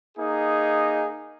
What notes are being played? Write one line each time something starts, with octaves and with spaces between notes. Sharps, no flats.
A#3 D#4 G#4